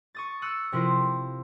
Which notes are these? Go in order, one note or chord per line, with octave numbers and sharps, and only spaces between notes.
C#6 D#6 A6
D#6 E6 F#6 C#7
C3 F3 E4 F4 A#4